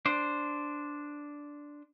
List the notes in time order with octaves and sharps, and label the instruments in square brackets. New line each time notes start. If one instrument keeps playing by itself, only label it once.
[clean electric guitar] D4 C5